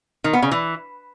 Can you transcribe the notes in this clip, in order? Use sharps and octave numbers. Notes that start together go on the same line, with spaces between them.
D#3
B3
C#3
E3